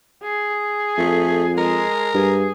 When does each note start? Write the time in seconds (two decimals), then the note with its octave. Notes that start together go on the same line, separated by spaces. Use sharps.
0.23 G#4
0.98 F2 A3
1.58 G#3 A#4
2.14 G2 G#4